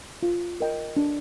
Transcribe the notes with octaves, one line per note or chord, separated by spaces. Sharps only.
F4
A#4 D#5 G5
D4